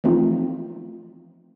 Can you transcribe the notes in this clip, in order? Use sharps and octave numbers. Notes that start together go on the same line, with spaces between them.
E3 F3 A3 C4 D#4 F4